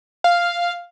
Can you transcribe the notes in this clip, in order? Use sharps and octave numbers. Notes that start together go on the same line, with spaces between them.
F5